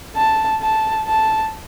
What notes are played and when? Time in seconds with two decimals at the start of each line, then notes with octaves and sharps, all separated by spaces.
0.16 A5
0.62 A5
1.08 A5